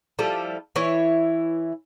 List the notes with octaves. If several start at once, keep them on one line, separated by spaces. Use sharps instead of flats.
F3 G3 E4 A4
E3 E4 C#5